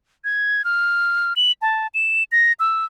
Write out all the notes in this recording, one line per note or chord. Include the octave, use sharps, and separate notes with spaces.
G#6
F6
F#7
A5
E7
A#6
E6